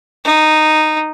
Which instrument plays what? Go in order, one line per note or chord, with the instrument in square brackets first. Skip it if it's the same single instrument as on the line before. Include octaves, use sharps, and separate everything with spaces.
[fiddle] D#4